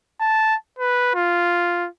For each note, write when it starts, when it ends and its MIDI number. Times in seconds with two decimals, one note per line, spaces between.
0.20 0.56 81
0.78 1.15 71
1.15 1.88 65